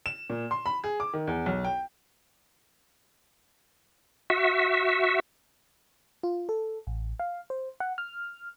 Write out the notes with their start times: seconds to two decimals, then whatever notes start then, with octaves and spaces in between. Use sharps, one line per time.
0.06 E7
0.30 A#2
0.51 C6
0.66 B5
0.84 G#4
1.00 D6
1.14 D#3
1.27 E2
1.46 B1
1.64 G5
4.30 F#4 E5
6.23 F4
6.49 A4
6.87 A1
7.20 F5
7.50 C5
7.80 F#5
7.98 F6